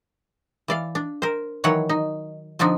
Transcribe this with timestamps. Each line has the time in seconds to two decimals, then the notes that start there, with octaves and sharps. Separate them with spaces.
0.68 E3 D5 F5
0.95 D4
1.22 A#4 C5
1.64 D#3 E3 F#3 C#5 F#5
1.89 D#4
2.59 D3 F3 C4 D4 D#4